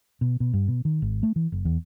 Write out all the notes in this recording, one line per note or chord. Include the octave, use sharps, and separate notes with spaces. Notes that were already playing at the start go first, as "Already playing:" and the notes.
B2
B2
G2
B2
D#3
G#1
A3
E3
F#1
E2